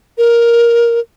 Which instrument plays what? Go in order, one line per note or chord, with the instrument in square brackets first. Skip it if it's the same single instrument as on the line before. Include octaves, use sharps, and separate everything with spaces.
[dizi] A#4